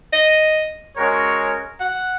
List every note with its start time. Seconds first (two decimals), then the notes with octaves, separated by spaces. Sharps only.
0.13 D#5
0.97 G#3 C#4 F#4 A#4 C#5
1.80 F#5